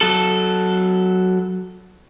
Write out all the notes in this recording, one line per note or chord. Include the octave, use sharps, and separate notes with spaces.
F#3 A4